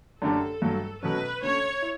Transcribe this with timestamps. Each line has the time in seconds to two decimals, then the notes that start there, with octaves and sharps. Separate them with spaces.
0.22 F#2 D3 A3 D4 G4 A4
0.62 G2 F#3 A3
1.02 B2 F#3 A3 C#4 B4
1.42 D2 D3 A3 C#4 C#5
1.82 E4